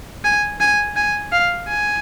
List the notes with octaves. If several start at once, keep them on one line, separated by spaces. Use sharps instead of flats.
G#5
G#5
G#5
F5
G#5